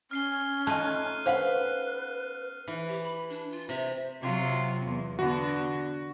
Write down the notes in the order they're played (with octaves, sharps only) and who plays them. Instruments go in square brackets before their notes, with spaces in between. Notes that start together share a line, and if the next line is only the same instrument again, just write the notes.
[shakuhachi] C#4 [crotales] F6 C7 G7
[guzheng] A3 D#4 F4 [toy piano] A5 [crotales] F#6 D#7
[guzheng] B3 C#4 [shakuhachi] B4 [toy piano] C5 F5 F#5
[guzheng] E3
[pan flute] G4
B5
D4
F4
[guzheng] C3 [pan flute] E5
[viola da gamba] C3 F#3 F4
E2
[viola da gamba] D3 B3 [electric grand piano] F#4